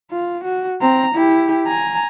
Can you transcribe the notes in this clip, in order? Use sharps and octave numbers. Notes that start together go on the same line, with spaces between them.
F4
F#4
C4 A#5
E4 G4
G#5 A#5